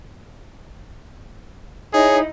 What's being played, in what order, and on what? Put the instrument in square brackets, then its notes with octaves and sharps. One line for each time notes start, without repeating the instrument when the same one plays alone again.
[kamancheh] D#4 E4 [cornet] G#4 [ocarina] C#5